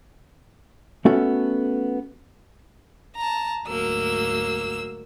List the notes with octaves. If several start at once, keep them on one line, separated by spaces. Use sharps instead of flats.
A3 B3 C#4 F#4 A4
A5 A#5
D2 G#2 F#3 A#3 E6